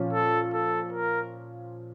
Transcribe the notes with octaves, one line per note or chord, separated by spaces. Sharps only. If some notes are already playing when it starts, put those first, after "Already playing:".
Already playing: A#2 F3 C#4
A4
A4
A#4